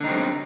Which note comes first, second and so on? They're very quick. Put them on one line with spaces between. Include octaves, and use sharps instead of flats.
D3 D#4 C4 F#3